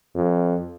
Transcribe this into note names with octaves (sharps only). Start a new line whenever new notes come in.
F2